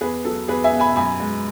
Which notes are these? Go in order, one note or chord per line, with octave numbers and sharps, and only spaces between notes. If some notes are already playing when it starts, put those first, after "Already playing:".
E2 G#4 B4
F#3 A4
E2 G#4 B4
E5 G#5
B2
G#5 B5
F#2 G#5 B5
G#3